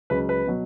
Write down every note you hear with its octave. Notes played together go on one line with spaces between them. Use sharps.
C#2 C#3 F#3 B4
B4
B2 F#3